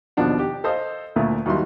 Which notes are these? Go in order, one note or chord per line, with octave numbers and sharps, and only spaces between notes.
D#2 B2 F3 D4 F#5
G4
A4 C5 D#5 F5
D2 A#2 A3
D#2 F#3 G3 E4 C6